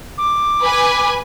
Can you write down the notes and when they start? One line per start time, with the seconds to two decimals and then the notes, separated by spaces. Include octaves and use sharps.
0.18 D6
0.63 B4 G#5